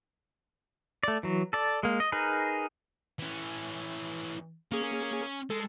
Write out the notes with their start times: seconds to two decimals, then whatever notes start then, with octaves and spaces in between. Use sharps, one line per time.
1.03 A3 D5
1.23 E3 F#3
1.53 A4 D5
1.83 G#3 A#3
2.00 D#5
2.12 D#4 G#4 A#4 B4
3.19 E3 C#4
4.72 A#3 C#4 G#4
5.50 G#3 A4